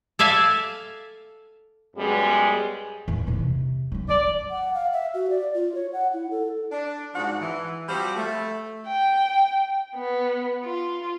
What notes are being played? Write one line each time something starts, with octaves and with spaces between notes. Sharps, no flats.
A4 D5 E5 F5 G#5
F#2 G3 G#3 B3 G#4
E2 A2
A#2 D#3
C3
F#3 D4
F3 D5
F#5
F5
E5
F#4
D5
F4
C#5
F#5
E4
A4
D4
G#2 F3 D4 F#4 D5 F#5
E3
F3 G3 C4 F#4 G4 C5
A3
G5
B3
F4